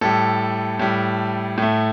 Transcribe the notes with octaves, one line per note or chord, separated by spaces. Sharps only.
A2 G3 A4
A2 G3
A2 A3